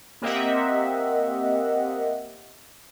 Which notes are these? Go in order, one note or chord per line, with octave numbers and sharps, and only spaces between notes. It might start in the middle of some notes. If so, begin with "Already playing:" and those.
A#3 C4 G4 D#5 E5 F#5